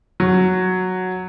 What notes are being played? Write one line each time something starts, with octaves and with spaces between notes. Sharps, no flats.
F#3